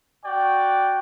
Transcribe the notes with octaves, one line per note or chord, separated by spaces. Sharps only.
F#4 D5 G5